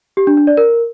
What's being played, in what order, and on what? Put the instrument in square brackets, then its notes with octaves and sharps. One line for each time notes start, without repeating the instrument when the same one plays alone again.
[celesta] G4
D4
D4
D5
A#4